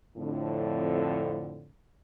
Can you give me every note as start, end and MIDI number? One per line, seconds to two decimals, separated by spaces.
0.16 1.69 41
0.16 1.69 45
0.16 1.69 50